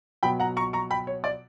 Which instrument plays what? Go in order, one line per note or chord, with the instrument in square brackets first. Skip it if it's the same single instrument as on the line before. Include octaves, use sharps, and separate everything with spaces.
[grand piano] B2 F#3 B3 G5 B5
F#5 A#5
A#5 C#6
A#5 C#6
G5 B5
C#5
D5